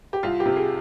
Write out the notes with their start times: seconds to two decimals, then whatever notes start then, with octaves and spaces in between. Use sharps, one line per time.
0.13 G4
0.23 C2 F4
0.40 G4
0.46 C3
0.57 G#4